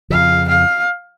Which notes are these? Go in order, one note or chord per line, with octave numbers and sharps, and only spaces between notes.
F2 C#3 F3 F5
F5